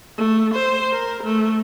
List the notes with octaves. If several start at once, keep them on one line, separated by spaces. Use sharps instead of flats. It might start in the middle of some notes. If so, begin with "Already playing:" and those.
A3
C5
A#4
A3